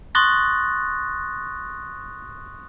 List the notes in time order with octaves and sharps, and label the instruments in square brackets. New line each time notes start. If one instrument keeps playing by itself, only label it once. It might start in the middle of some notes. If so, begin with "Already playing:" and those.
[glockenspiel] C6 C#6 D#6 F#6 A6 A#6